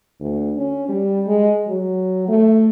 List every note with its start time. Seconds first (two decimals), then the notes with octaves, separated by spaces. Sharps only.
0.21 D2
0.57 C#4
0.88 G3
1.27 G#3
1.68 F#3
2.28 A3